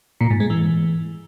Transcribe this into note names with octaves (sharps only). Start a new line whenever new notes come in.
A#2
G#2
G#3
E3